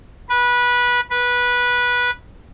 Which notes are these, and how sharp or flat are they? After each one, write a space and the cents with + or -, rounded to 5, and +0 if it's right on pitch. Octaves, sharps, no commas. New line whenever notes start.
B4 -20
B4 -15